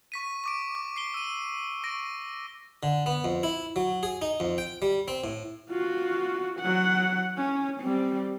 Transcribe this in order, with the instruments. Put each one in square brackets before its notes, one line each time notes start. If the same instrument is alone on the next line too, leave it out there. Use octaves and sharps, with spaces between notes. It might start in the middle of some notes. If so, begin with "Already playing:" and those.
[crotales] C#6 B6 D#7
C#6 D6 D7
D6
C7 D7 G7
E6 D#7
C#6 A#6 D7
[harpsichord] D3
B3
F2
E4
F#3
G#4
D#4
F2
G5
G3
C4
A2
[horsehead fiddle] F4 F#4
F#3 F#5
C#4
G3 C4